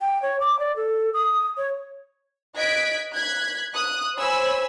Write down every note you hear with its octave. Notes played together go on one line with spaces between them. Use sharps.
G5
C#5
D6
D5
A4
D#6
C#5
D#5 F#6 G#6 B6 D7
F#6 G#6 B6
D#6 F#6
C5 C#5 G#5 B5 E6